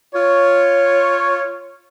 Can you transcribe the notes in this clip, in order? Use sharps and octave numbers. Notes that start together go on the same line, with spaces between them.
F4 C#5